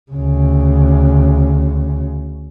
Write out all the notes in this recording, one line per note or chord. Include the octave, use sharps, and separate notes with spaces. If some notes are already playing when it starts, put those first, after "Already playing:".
D2 C#3